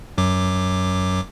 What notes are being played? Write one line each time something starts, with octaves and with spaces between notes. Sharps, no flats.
F#2 F#3 D6